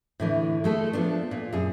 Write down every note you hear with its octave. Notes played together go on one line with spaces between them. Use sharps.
A2 D3 E3
G#3 A3 A4
F3 B3 D4
A#2
F#2 G#4